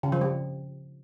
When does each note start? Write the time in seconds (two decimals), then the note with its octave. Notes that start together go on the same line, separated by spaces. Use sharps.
0.03 C#3
0.12 F3
0.21 G3